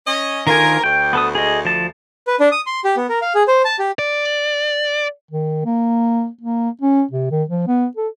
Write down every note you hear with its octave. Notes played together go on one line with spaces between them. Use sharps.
C#4 D#5
D2 D#3 F4 A#4 G#5
D2 G5
B3 A4 D#6
G#4 D#5
F3 A5
B4
D4
D#6
C6
G4
B3
A#4
F5
G#4
C5
A5
G4
D5
D#3
A#3
A#3
C#4
C3
D#3
F3
B3
A4